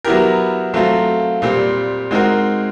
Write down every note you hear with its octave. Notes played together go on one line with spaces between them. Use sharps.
F#3 B3 E4 G4 A#4
F#3 A3 C4 F4
A#2 G3 C4
G#3 C4 D#4 F#4 A#4